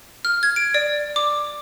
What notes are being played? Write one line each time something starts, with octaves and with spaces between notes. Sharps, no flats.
F6
G#6
D7
D5
D6